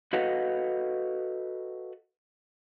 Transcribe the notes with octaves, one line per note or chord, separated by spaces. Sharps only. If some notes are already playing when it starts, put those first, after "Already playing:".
F#4 A4 B4 D#5 F5 F#5